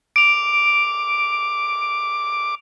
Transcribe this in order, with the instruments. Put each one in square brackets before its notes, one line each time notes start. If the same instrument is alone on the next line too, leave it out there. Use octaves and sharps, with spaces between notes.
[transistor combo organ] D6 [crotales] D7 F7